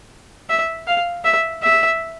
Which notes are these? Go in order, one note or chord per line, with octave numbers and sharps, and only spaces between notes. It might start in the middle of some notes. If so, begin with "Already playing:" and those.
E5
F5
E5
E5